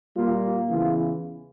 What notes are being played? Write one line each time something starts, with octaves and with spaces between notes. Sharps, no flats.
A#2 G3 A#3 F4
E2 C#3 E3 F4